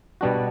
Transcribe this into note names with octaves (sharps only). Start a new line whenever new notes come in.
B2 G3 B3 D4 F#4